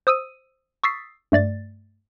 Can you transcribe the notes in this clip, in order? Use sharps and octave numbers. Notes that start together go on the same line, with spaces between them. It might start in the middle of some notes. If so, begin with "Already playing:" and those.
C5 D#6 E6 D#7
C#6 D#6 E6 A6 B6 C7
G2 A3 D5 A6